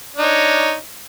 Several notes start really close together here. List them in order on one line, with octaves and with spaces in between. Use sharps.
D4 D#4 C#5